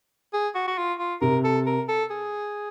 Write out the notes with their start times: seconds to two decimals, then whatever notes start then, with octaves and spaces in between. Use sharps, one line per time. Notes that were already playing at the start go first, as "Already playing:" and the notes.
0.33 G#4
0.55 F#4
0.68 F#4
0.78 F4
0.99 F4
1.21 C3 A#4
1.44 A4
1.67 A#4
1.89 A4
2.10 G#4